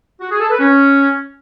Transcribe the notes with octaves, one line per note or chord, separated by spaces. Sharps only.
F#4
G#4
A4
B4
C#4